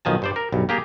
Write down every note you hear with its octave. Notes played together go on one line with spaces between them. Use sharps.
B1 D#3 F3 G#5 A5
G2 C5 D5
A#4
B1 G2
A#3 G4 G#4 A#5